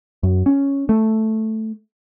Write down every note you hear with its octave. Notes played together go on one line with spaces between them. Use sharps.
F#2
C#4
A3